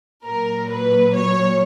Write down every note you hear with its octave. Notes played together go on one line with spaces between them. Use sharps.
A#2 F#3 A#4
B4
C#5